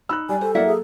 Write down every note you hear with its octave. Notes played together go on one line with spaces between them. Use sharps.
D#4 B5 E6 F#6
G3 D5 G#5
A4 C5
F#3 A#3 E4 D5 E5 F#5
G#4